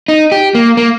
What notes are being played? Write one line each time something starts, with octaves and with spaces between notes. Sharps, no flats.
D#4
G4
A#3
A#3